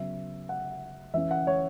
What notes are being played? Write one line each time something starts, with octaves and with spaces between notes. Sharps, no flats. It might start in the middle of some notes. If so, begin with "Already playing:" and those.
Already playing: C#3 F#3 B3 E5
F#5
E3 C#4 E5
F#5
C#5